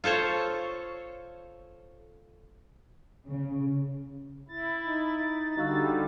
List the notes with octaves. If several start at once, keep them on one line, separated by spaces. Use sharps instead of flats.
F4 A4 C5 C#5
C#3
E4 A6
D#4
D3 G3 D#4 F#4 F5 E6